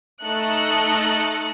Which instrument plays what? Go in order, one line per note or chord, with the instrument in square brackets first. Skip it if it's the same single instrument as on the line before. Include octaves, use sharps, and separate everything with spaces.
[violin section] A3 D#4 A4 D#5 F#6 C#7